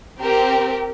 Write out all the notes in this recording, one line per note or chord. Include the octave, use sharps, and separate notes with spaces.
C4 G4 A#4